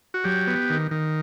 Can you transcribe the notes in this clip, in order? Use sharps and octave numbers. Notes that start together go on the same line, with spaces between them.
F#4
F#3 G4
B3
D#3
D#3